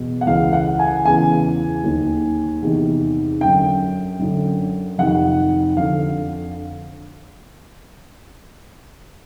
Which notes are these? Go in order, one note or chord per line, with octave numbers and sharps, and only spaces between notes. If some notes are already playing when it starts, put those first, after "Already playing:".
Already playing: E2 B2
F#5
C#2 C#3 E3 F5
F#5
G#5
E2 C#3 E3 G#5
D#2 D#3
E2 C3 D#3
F#2 D3 G5
F#2 D3
F2 C3 D#3 F#5
F2 D3 F5